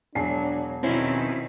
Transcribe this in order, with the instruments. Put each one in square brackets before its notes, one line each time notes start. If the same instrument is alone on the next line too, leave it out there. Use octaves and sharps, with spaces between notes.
[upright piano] E1 G#5 C7 [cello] F#3 [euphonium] D4
[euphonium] F2 [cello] B2 D#3 [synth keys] C4 C#4 E4